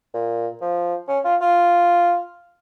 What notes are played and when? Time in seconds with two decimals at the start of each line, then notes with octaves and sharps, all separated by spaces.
0.14 A#2
0.61 F3
1.08 C#4
1.24 F4
1.41 F4